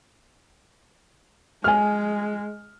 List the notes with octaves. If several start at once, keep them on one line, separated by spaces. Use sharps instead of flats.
G#3 G#5 F6